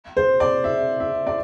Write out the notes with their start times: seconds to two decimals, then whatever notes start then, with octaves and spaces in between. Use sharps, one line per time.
0.17 C5
0.40 D5
0.64 E5
1.00 E5
1.27 D5